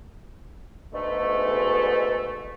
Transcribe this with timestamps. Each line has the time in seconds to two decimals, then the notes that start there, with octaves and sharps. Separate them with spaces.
0.93 G#2 B2 D3 A3